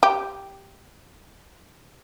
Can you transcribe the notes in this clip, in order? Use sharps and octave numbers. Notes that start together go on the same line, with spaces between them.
G4